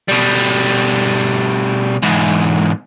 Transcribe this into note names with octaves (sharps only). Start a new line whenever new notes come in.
B2 G3
E2 G#2